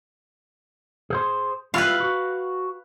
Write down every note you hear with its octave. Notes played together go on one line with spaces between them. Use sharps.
G#4 C5 C6
G3 E4 F4 B4 F5
F#4